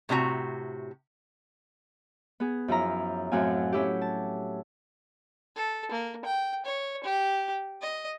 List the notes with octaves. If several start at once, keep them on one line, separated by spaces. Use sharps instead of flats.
A2 C3 D4 F#4 A#5
B3 G#4
F#2 F3 E4 A#5
F#2 A2 F#3 C4 F5 G#5
F#3 C#4 E4 G4
A5
A4
A#3
G5
C#5
G4
D#5